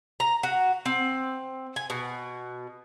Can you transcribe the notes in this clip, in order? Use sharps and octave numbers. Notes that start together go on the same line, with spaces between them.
A#5
F#4
C4
G#5
B2